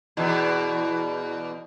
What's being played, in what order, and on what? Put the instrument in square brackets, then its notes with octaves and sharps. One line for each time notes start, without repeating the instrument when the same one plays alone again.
[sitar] E2 B2